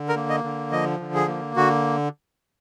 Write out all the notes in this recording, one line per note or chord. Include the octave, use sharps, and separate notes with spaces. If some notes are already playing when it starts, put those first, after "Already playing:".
Already playing: D3
A#4
A#3
D#5
D3
F3 D#5
D3
G#4
A#3
D3 F#4